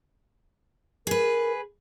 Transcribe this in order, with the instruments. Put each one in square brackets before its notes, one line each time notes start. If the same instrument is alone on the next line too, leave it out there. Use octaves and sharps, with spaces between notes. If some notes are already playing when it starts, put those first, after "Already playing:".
[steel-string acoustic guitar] G#4 B4 [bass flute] A#4